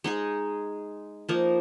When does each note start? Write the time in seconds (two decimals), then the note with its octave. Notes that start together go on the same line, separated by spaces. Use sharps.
0.04 G#3 D#4 G#4
1.29 F3 A#3 D#4 A#4